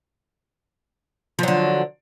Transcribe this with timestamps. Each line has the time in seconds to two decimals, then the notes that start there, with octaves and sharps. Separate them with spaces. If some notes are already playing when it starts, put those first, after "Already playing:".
1.39 F3
1.43 F#3
1.48 D3